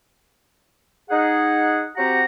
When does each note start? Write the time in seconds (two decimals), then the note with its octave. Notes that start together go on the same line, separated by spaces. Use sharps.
1.11 D#4 G#4 F#5
1.97 C4 F#4 G4 F#5 A#5